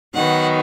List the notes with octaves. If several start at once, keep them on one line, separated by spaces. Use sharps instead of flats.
D#3 F#3 B3 F#5